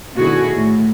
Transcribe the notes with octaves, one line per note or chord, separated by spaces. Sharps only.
B2 D3 D#3 E4 F#4 G#4
A2